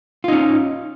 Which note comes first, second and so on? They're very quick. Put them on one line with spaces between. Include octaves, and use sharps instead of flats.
F4 D#4 C#4